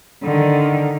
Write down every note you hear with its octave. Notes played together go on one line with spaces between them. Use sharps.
D3 D#3